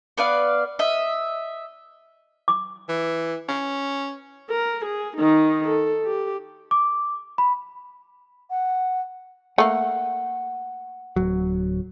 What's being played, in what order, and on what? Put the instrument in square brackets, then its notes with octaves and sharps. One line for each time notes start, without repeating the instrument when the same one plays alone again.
[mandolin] B3 B4 D5 F5
D#5 E5
[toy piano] D6
[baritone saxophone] E3
C#4
[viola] A#4
G#4
D#3 D#4
A4
G4
[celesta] D6
B5
[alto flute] F#5
[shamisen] A3 A#3 [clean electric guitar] F#5
[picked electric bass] D1 F#3